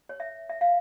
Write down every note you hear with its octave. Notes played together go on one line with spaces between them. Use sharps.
C#5
E5
E5
F5